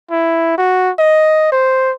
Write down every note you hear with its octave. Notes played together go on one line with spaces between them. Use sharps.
E4
F#4
D#5
C5